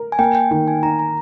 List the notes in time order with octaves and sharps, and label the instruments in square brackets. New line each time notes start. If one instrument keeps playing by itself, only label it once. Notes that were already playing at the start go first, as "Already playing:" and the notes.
Already playing: [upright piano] A#4
[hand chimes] G#5
[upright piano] A#3 [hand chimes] G5
[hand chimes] G5
[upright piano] D#3 [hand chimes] G5
[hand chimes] G#5
[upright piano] D#4 [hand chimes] A#5
[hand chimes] A#5